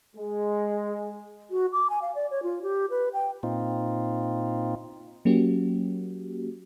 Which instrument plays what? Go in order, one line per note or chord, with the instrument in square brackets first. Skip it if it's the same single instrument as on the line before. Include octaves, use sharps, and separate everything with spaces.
[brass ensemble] G#3
[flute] F#4
D6
G#5
F5
D5
C#5
F4
G4
B4
G5
[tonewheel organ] A#2 C4 D#4 F4
[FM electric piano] F#3 A#3 C#4 F#4 G4